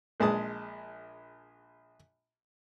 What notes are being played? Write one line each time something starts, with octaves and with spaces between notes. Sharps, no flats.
A#1 G#3 A5 D#6